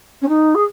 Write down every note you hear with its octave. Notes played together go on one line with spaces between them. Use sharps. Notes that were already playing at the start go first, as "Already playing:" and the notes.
C#4
D#4
G#4